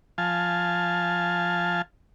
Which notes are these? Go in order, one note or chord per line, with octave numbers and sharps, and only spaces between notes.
F3 F5 G#5 A5